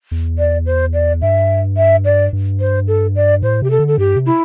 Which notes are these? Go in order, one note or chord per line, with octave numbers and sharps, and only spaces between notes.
E2
D5
C5
D5
G2 E5
E5
D5
G2
C5
A4
D5
A2 C5
C3 G4
A4
D3
A4
G2 G4
C3
E4